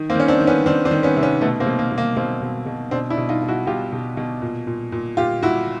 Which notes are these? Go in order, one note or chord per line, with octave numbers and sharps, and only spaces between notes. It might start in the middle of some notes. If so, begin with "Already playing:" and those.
Already playing: D#3
A#3 C4
D#3 C#4
C4 D4
D#3
B3 C#4
D#3 C4 D4
C4 D4
D#3
B3 C#4
C3
B3 C#4
B2 A3 B3
A#3 C4
B2
A#3
B2
A#3
B2 A#3 C4
B2
B2
B2 C4 D4
D4 E4
B2
D#4 F4
B2
E4 F#4
B2 F4 G4
B2
B2
A#2
A#2
A#2
A#2 F4 G4
A#2 E4 F#4